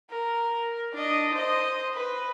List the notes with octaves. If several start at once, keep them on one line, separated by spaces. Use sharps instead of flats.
A#4
D4 D#5
C5 D#5
B4